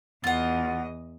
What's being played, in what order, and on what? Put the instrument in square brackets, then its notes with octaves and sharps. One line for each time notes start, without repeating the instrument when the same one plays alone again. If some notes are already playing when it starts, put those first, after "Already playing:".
[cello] E2 D#5 [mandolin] F4 F#5